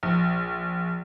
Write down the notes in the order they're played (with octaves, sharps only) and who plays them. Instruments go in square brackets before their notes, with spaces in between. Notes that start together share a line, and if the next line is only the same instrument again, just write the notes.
[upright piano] A#1